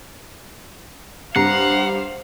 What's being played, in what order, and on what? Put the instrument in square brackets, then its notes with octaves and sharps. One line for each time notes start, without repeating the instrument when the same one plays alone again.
[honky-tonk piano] G2 [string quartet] C5 F5 [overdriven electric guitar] F#5 [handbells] A#5 C7